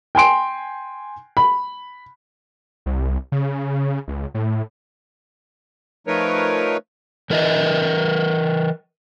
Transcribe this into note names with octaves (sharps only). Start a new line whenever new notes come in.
G5 G#5 C6 D7
B5
C2
C#3
C#2
A2
F3 A3 D#4 A#4 B4 C#5
E3 A#4 B4 D#5 E5